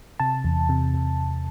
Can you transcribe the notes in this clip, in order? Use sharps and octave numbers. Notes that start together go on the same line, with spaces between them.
C3 A5
E2
C3
C3